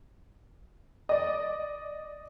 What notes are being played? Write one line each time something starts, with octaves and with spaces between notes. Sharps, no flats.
D5 D#5